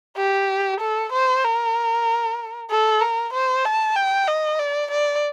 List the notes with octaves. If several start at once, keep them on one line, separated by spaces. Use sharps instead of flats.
G4
A4
C5
A#4
A4
A#4
C5
A5
G5
D#5
D5
D5